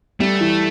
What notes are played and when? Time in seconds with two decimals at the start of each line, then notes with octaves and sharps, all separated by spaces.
0.20 G3 A3
0.41 E3